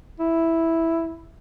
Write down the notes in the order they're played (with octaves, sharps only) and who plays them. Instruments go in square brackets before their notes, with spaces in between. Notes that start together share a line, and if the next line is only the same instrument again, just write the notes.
[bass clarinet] E4